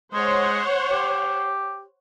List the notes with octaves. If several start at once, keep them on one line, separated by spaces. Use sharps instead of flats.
G#3 C5 C#5 F#5
G4